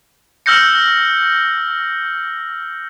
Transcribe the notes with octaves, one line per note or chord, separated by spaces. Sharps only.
E6 F6 G6 A#6 C#7